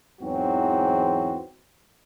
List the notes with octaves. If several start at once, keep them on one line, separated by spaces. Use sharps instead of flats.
E2 G#2 E3 F#3 C4 F#4